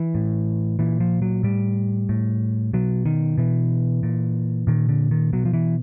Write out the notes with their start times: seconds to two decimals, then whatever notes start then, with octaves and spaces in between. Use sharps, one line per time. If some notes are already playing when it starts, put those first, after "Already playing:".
Already playing: E3
0.15 A2
0.79 A#2 E3
1.00 F3
1.22 F#3
1.43 A2 G3
2.09 A2
2.73 B2 F#3
3.06 D#3
3.38 B2 E3
4.03 A#2
4.67 A#2 D#3
4.89 D3
5.11 D#3
5.33 B2 F#3
5.45 F3
5.53 E3